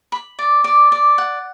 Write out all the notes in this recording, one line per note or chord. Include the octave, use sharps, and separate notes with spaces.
B5
D5
D5
D5
F#5